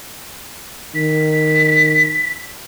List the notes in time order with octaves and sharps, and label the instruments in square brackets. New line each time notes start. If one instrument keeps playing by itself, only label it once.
[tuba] D#3 [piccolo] B6